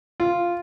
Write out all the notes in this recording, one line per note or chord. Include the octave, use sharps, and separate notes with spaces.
F4